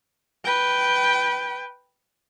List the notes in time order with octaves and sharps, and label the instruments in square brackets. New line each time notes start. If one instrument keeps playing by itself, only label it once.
[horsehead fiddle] B4 G5